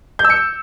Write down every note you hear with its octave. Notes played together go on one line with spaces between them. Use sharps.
G6
E6
C#7